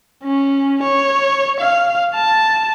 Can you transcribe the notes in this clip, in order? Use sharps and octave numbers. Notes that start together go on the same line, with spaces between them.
C#4
C#5
F5
A5